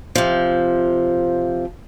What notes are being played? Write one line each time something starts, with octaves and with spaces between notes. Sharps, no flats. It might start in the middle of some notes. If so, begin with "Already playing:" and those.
C3 F3